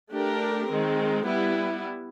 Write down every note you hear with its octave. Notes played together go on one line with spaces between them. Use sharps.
A3 D4 G4 A#4
D#3 G#3 C4
G3 B3 E4